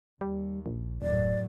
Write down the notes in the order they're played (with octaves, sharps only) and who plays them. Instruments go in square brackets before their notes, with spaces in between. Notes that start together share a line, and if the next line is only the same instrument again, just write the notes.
[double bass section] D#2 [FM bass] G3
[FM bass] A#1
[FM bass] D#1 [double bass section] F#2 A2 F#3 [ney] D5